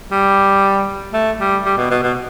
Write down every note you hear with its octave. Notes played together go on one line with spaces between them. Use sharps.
G3
A3
G3
G3
B2
B2
B2